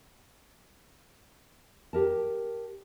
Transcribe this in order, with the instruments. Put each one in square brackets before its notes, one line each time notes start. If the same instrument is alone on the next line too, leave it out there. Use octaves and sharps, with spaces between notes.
[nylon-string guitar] G4 A#4 A5